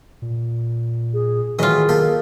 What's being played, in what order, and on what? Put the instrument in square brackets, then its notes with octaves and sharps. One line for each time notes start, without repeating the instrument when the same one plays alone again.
[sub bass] A#2
[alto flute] G#4
[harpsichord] A2 E3 F#3 [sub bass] D#3 [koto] F4 D#5 [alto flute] G#4
[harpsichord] A#3 G4 A4